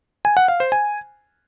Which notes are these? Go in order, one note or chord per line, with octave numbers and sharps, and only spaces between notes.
G#5
F#5
F5
C5
G#5